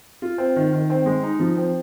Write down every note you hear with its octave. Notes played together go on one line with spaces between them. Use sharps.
F4
C4
D#3
D#3
C4
G#3
D#4
F3
C4